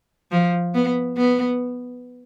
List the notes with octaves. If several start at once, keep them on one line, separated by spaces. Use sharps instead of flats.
F3
B3
B3